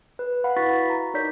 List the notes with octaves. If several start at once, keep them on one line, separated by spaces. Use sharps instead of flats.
B4
F5 F#5 B5
E4 F#4 B4 C#6 A6 B6
A#5
D#4 A#4 C#5 D5 G6 B6